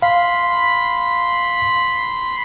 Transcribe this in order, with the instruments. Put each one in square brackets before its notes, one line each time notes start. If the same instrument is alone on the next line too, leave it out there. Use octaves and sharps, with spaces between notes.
[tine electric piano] F5 [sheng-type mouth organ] B5 C6